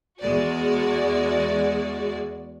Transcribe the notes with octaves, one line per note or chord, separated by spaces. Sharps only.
E2 G#3 F#4 D5